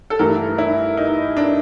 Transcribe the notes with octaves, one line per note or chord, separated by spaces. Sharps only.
A4
G2 E3 A3 A#4
E4
D#4
D4